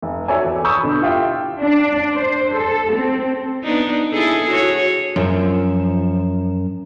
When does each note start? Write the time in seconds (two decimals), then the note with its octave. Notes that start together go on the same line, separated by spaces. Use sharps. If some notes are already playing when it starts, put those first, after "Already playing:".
0.02 F1
0.28 F#4 A4 C#5 D5 E5 G#5
0.45 E2
0.64 B5 C#6 D#6 E6 G6
0.83 B2 D3
1.01 E4 F4 G4 E5 G5
1.59 D4
2.15 C5
2.57 A4
2.95 C4
3.64 B3 D4 D#4
4.12 E4 G#4 A4
4.50 F#4 C#5
5.16 F#2 F3 E7